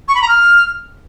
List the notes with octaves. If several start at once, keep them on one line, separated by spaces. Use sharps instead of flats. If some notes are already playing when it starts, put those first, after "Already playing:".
C#6
B5
A#5
F6